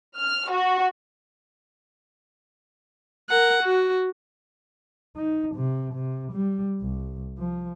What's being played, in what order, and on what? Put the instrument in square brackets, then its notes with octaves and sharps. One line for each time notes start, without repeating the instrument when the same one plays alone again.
[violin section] F6
F#4
[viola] A#4 F#5
F#4
[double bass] D#4
C3
C3
G3
C2
F3